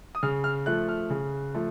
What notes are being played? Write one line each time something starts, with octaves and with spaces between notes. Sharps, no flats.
D#6
C#3 F6
F6
F3 A3 F#6
F6
C#3
F3 A3